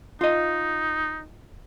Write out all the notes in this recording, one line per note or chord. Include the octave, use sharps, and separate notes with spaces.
D#4 F4 D#5